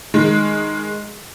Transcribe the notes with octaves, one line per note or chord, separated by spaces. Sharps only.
D#3 G#3